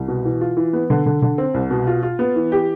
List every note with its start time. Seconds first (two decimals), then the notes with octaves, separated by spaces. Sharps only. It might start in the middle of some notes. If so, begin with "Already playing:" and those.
Already playing: C2
0.08 B2
0.25 E3
0.41 F4
0.57 E3
0.73 B3
0.90 D3
1.06 D3
1.22 D3
1.38 C4
1.54 C2
1.71 B2
1.87 F4
2.03 F4
2.19 B3
2.36 E3
2.52 G4